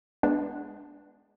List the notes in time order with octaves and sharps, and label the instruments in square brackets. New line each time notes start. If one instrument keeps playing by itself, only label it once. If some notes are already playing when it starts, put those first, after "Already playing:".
[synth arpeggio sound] G#3 B3 D4